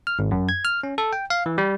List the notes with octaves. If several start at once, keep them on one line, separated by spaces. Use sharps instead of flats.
F6
G#1
F#2
G#6
F6
C#4
A4
G5
F5
E3
G3